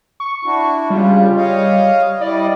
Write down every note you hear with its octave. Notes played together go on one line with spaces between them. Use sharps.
C#6
D4 E4 F#4
C#3 G3 F4
C#5 D#5 F5
G3 E4 D5 D#5